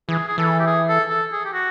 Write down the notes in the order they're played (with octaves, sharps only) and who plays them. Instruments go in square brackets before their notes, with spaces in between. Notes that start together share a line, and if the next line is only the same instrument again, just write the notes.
[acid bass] E3 [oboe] G#4
[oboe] G#4
[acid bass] E3 [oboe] A4
[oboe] G4
G#4
A4
A4
G#4
G4
F#4